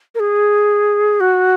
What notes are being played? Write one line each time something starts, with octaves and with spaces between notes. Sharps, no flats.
A#4
G#4
F#4